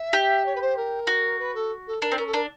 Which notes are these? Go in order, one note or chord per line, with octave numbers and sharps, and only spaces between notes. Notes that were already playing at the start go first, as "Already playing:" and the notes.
Already playing: E5
G4
C#5
B4
C5
A#4
F#4
B4
A4
A4
D4 A#4
C4
C#4 A#4
A4
D4 A#4